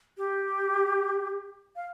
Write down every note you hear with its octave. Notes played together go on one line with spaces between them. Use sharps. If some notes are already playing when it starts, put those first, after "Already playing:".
G4
F5